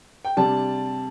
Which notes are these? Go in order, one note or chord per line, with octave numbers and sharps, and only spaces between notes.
G5
C3 G3 D4 A5